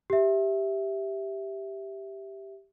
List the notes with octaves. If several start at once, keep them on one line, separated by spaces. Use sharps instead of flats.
G4 E5